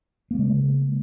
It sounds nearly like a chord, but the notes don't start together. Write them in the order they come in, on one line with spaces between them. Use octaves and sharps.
A#3 G#3 C#3